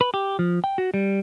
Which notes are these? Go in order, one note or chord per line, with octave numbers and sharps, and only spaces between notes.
B4
G4
F3
G5
F#4
G3